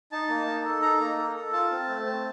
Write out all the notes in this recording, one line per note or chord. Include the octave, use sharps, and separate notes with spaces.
D#4 A5
A#3
D#4
A4
D#4 A#5
A#3
A4
A4
F4 A5
C4
A3
C4